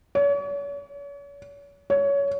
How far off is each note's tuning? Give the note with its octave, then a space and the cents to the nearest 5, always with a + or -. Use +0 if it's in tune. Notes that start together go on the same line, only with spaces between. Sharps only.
C#5 +40
C#5 +20